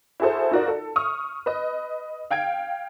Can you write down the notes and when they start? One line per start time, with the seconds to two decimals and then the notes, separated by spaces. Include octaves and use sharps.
0.20 E4 F#4 G#4 A4 C5
0.51 D#4 F4 F#4 A#4 D5
0.68 A4
0.96 C#6 D#6 F6
1.46 B4 D#5
2.31 F5 G5 G#6 D7